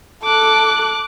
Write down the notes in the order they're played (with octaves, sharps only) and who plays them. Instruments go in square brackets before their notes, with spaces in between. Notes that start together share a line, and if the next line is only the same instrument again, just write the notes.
[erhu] A4 [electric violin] D6 F#6